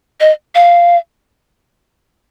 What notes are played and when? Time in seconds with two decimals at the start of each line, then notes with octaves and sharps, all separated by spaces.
0.20 D#5
0.55 F5